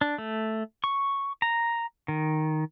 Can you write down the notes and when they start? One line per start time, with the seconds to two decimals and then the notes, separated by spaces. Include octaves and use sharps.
0.01 D4
0.18 A3
0.84 C#6
1.42 A#5
2.08 D#3